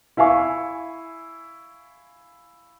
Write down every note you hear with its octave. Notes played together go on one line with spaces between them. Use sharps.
E4 E5 F5 G#5 C#6